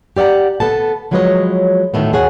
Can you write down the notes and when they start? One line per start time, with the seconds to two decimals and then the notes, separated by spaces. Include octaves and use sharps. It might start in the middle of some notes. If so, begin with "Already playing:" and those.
0.17 G4 D5 E5 F#5 A#5
0.60 B3 A4 A5
1.11 F3 F#3 G#3 B4 C#5 D#5
1.94 D2 A2 D#3 A3 B3
2.13 D#2 B2 G#4 C#5 F#5